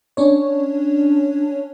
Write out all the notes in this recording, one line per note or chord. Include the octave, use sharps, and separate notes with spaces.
C#4 D4 C#5